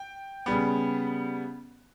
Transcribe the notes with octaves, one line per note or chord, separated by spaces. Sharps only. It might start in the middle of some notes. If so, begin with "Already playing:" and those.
Already playing: G5
C#3 G3 B3